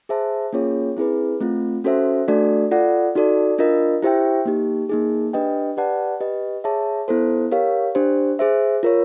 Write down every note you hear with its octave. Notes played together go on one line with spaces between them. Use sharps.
G#4 C5 E5 A5
A#3 C#4 F4 G#4 C#5
C4 E4 G#4 B4
A3 C4 F4
C#4 F#4 A4 C5 E5
A3 D4 F#4 A4 D5
F4 A4 D5 F#5
D#4 F#4 A4 D5
D4 F4 A#4 D#5
E4 G4 C5 E5 G5
A#3 D#4 G4
A#3 D#4 G#4
D4 G4 B4 D#5 G5
G4 B4 D5 F#5 A5
G4 B4 D#5
G#4 C#5 E5 A5
B3 E4 A4 C5
G4 A#4 C#5 F5
D4 G4 C5
G#4 C5 E5
F4 A#4 C#5